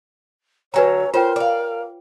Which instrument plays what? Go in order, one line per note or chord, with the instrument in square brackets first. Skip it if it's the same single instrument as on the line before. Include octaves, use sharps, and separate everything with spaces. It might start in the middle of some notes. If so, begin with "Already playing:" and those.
[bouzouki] D3 F#3 [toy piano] B4 G#5 A#5 [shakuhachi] C#5
[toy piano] F4 C#5 G5 [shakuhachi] A#4 [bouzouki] C5
[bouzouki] D5 F5